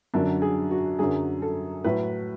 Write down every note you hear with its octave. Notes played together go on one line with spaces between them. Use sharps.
F#2 D3 F#3 D4
G#4
F#4
F#2 D3 F#3 G#4
A4
A2 F#3 B4